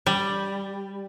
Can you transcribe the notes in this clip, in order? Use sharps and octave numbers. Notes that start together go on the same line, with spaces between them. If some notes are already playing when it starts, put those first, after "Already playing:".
G3